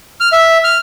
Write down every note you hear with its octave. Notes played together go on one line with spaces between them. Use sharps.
F6
E5
F6